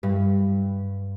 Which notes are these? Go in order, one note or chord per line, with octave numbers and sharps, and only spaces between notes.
G2